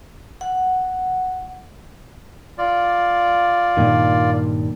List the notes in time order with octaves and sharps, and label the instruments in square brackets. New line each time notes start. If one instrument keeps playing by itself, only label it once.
[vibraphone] F#5
[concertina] F4 D5
[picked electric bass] G2 A#2 D#3